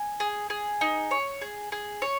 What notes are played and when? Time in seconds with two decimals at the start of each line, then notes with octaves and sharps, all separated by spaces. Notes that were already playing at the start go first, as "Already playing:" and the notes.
Already playing: G#5
0.20 G#4
0.50 G#4
0.81 D#4
1.11 C#5
1.41 G#4
1.72 G#4
2.02 C#5